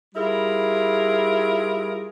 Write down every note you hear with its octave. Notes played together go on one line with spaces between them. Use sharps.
G3 E4 F4 G#4 A#4